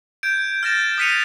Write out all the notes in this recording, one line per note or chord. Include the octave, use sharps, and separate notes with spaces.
G6 G#6 D7
F6 G6 A6 A#6 E7
D#6 F#6 B6 C#7 D#7 F7